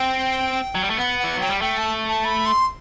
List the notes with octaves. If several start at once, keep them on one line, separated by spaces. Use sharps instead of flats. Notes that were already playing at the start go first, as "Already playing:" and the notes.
Already playing: C4 G5
F#3
G3
A3
B3 F#5
E3 F#5
F#3 G5
G3
A3 G5
A5
A5
B5
C6